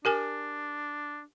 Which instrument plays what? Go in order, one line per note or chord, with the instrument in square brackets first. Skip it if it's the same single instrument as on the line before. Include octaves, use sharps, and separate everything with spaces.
[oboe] D4 [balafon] G4 A#4 G#5